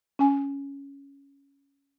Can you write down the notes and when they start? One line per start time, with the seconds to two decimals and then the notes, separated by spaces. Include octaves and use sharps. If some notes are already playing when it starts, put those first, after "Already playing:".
0.19 C#4 G#5